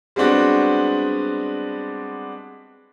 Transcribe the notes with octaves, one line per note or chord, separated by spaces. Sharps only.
G3 G#3 B3 C4 D4 F#4